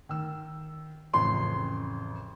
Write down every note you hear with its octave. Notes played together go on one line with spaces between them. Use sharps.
D#3 E6
A1 F2 C#3 C6